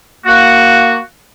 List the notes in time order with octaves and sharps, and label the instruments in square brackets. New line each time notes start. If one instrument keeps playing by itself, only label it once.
[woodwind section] A#3 F#4